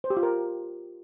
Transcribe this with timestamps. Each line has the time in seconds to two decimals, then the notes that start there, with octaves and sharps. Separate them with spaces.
0.04 C5
0.10 G4
0.17 F4
0.23 A#4